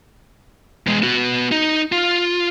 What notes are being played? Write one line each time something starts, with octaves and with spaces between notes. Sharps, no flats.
E2 G#3
B3 F#4
D#4
F4